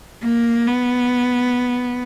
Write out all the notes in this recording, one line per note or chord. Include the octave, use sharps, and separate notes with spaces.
A#3
B3